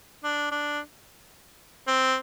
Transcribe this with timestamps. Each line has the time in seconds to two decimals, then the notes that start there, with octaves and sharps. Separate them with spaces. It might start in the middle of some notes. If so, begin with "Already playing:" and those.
0.24 D4
0.51 D4
1.87 C4